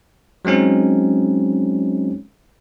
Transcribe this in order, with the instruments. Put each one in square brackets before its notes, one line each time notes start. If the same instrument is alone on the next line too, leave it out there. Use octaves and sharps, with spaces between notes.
[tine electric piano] F#3 G#3 C4 C#4 D#4